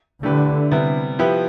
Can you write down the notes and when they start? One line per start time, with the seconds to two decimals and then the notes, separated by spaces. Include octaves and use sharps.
0.23 D3 A3 E4 G4 B4
0.71 C3 G3 B3 E4
1.19 F3 B3 E4 G4 B4